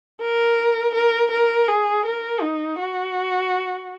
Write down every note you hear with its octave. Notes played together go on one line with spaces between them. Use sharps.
A#4
A#4
A#4
G#4
A#4
D#4
F#4